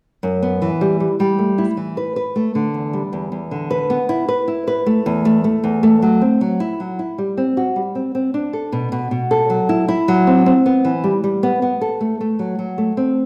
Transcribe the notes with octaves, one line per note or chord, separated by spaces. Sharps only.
F#2
B3
E3
G3
G3
G3
A3
E4
E3
B4
B4
A3
D3
E2
G3
E2
E2
D3
B4
B3
E4
B4
E4
B4
A3
E2
A3
A3
E2
A3
F#3
C4
F#3
E4
F#3
E4
G3
C4
F#4
G3
C4
C4
D4
A4
B2
B2
B2
A4
F#3
E4
E4
F#3
C4
C4
B3
E3
G3
G3
B3
B3
A4
A3
A3
F#3
F#3
A3
C4